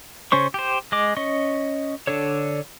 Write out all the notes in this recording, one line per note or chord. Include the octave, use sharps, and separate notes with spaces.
C#3 C#4 C5 C#6
G4 C5
G#3 D#5 D6
C#4 D#5 C#6
D3 D4 A4 C#5